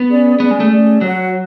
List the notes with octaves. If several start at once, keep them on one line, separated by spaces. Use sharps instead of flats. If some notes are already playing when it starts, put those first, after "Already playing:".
Already playing: B3
C#4 G#4 D5
B3 C#4 G#4 D5
G#3
A3
C#4 G#4 D5
F#3 F#4 C#5 F#5